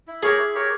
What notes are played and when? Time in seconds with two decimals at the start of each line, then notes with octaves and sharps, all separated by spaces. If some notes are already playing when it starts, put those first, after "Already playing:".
0.07 E4
0.23 G4 G#4 A#4 C#5
0.38 E4
0.54 G4 A#4 C#5